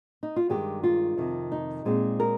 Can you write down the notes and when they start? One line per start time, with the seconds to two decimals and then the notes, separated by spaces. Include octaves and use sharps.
0.23 D#4
0.36 F4
0.49 G2 D#3 G#3 G4
0.83 F4
1.17 F2 C3 D#3
1.52 D#4
1.85 A#2 G#3 C4
2.20 A#4